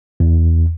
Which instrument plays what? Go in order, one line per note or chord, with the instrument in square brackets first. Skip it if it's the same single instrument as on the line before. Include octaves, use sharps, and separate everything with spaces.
[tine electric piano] E2